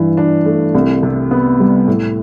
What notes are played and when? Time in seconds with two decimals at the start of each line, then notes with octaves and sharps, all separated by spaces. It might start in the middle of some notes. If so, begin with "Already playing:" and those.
Already playing: G2 E3
0.17 D4
0.46 A3
0.74 C2
1.03 C3
1.31 B3
1.60 G3
1.87 A2